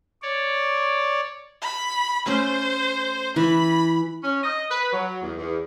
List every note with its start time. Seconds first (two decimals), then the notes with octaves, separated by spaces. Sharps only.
0.22 C#5 D5
1.61 B5
2.26 A3 C#4 C5
3.36 E3 B5
4.23 C#4
4.44 D#5
4.71 B4
4.93 F#3
5.22 E2
5.38 E2